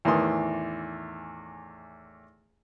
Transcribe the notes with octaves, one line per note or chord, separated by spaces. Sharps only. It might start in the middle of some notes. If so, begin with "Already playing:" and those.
E2 A2 D#3 E3 C6 D#6